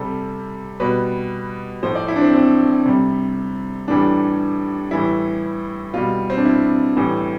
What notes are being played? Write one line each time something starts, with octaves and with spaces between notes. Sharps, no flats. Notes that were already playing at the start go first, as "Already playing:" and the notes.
Already playing: C3 G3 A4
B2 G3 B4
A2 F3 C5
D5
E4
D4
C4
C4
C3 G3
A2 E3 G3 D4
A2 E3 G3 E4
B2 G3 F4
C4
D4
E4
A2 E3 G3